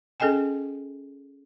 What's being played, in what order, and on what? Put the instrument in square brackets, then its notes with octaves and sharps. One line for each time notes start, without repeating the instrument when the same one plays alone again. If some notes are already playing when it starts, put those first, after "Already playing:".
[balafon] C#4 G#4 A4 D#5 G5 G#5